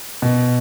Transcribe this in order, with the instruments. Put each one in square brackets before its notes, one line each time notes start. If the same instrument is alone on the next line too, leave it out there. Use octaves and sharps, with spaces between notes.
[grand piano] B2